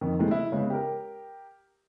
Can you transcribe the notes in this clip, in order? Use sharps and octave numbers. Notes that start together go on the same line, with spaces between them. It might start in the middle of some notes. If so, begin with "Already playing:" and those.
F2 D#3
C3 E3 G#3 A3
E4
C#3 G#3 B3
G4 A#4